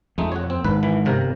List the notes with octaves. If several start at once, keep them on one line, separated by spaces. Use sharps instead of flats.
F2 G#3 A3 D#4
F#4 C#5
C4
G#2 D#3 B4
E3
G1 C3 A#4